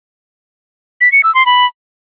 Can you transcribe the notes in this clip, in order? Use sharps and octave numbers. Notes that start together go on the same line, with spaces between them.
B6
C#7
E6
C6
B5